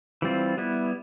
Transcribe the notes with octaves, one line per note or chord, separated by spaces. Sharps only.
E3 G3 C4 F4
G3 B3 E4